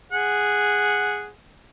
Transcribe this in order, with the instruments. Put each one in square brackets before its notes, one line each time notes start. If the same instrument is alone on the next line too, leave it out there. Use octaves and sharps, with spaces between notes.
[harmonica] G#4 F#5